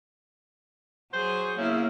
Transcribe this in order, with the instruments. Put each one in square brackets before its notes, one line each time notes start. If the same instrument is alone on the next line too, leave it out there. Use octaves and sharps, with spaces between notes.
[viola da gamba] F#3 G#4 [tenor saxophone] C5
[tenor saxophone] C#3 [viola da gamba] A#3 B3 E4